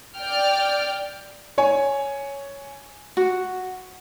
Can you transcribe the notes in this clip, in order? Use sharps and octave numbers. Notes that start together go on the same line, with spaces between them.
D5 G5 F6
C#5 G#5
F#4